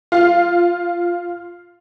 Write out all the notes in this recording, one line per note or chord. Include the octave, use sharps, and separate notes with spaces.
F4 F5